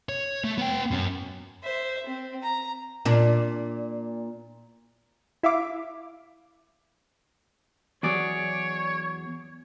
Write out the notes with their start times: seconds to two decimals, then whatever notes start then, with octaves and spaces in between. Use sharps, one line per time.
0.09 C#5
0.44 A3
0.58 B3 G5
0.91 F#2 C#4
1.63 C5 E5
2.06 C4
2.43 A#5
3.05 A#2 D4
5.43 E4 E5 F5 D6
8.03 E2 F#3 G#4 C#5 D5